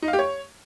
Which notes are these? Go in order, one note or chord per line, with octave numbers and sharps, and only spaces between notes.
D#4
F5
G4
C#5